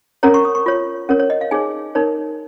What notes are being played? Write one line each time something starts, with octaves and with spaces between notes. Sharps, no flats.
C#4 A#4 C#5 A#5
C#6
D#6
C#6
F4 C#5
C#4 A#4 C#5
C#5
D#5
F5
D#4 G#4 C#5 G#5
D#4 A#4 C#5